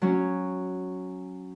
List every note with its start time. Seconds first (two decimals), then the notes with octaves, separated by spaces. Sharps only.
0.02 F#3 C#4